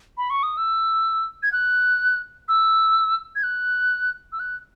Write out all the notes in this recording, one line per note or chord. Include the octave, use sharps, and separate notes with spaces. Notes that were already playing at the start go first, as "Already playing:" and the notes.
B5
C#6
D#6
E6
G#6
F#6
E6
G#6
F#6
E6
F#6